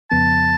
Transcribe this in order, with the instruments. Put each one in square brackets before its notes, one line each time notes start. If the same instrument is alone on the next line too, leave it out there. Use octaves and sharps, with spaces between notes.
[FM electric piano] F2 C#3 F3 B3 [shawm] A5